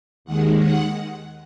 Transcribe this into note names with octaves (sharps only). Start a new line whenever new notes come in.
D#2 D#3 G#3 F#5
F#5